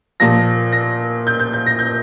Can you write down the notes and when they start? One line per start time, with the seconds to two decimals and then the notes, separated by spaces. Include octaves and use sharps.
0.20 A#2 F3 A#6
0.72 A#6
1.27 G6
1.40 G6
1.53 G6
1.66 A#6
1.79 G6